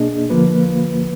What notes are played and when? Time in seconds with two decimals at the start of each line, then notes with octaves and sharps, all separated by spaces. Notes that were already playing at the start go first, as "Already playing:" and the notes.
Already playing: B2 A#3 D4 G#4 D#5
0.30 D3 F3 A#3 F4 B4